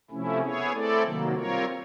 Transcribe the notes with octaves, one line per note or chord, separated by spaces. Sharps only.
C3 F3 A3 C#4 E4
B3 E4 G#4 C#5
A3 C4 E4 A4 D5
C3 D#3 F#3 A#3
G3 C4 F4 A#4 C#5